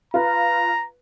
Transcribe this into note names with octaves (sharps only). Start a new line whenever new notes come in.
F4 B4 A#5